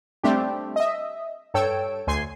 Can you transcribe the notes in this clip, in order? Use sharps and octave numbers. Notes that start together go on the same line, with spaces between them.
G3 A3 C4 D4 G4
D#5 E5
G2 A4 C#5 G5 E6 D7
D2 G#5 C6 C7